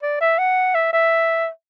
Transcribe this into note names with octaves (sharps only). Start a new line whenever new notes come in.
D5
E5
F#5
E5
E5